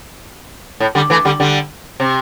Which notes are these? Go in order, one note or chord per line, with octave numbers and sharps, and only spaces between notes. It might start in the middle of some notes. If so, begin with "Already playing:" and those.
A2
D3 G3
E3 A3
D3 G3
D3 G3
C3